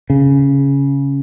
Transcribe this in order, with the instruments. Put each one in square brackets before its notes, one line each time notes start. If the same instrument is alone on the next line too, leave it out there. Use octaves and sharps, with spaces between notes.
[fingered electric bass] C#3